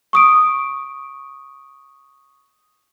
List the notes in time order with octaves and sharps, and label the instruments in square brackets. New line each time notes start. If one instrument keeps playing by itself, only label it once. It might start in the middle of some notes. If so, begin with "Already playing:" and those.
[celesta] C#6 D#6 D7